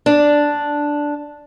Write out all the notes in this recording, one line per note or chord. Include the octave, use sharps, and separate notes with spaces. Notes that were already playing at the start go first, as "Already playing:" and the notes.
D4